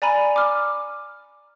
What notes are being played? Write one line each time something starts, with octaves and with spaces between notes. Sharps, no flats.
D5 G#5 A#5 B5 D#7
D6 F6